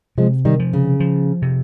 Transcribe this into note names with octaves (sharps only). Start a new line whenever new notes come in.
C3 F3 G#3
D#3 G3
F3
C#3
F3
C3